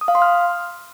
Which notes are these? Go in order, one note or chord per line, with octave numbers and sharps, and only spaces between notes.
D#6
F5
C6
F6